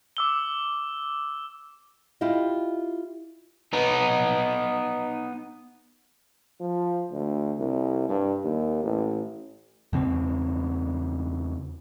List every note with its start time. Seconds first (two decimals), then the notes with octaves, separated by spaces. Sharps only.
0.17 D6 E6 G7
2.21 E4 F4 G4 D#5
3.73 B3 D#4
6.60 F3
7.12 D2
7.59 C2
8.09 G2
8.44 D#2
8.83 A1
9.93 E2 C#3 C4